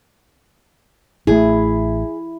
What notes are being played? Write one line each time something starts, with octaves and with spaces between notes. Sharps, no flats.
A1 A3 E4 G#4